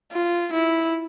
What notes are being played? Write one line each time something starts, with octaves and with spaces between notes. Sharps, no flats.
F4
E4